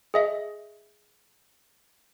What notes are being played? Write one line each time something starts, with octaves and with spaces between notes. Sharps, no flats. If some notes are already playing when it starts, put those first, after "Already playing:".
G#4 D#5 E5